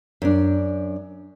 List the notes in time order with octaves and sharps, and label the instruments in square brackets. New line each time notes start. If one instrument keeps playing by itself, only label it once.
[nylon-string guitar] F#2 D4